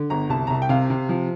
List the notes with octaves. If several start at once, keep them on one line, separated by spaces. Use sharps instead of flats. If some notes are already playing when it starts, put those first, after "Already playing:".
Already playing: D3
G1 A#5
C2 A5
A#5
C2 A5
G5
C3 F5
C3
F3